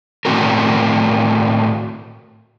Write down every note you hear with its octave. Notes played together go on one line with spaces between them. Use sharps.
A2 D#3 F3 C4 F#4 A#4